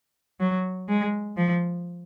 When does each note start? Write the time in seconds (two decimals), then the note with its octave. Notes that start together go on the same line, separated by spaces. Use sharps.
0.40 F#3
0.88 G#3
1.37 F3